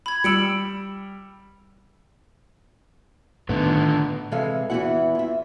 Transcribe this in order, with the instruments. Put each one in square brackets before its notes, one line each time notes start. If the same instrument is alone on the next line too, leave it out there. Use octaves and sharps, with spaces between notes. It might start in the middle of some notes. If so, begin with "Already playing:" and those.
[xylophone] B5 G#6
[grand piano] G3 E6 [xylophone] C#7 D7 F#7
[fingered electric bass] A2 D#3 [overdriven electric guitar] D3 B3
[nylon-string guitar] C3 E3 G#3 A4 E5 F5
E2 E3 A#3 E4 F#4 F#5
F4 E5